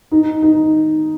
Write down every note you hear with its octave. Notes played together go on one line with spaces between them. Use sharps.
D#4
D#4